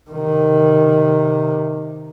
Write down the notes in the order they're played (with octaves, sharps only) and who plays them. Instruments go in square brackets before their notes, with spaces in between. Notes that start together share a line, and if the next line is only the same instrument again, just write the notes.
[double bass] C3 D#3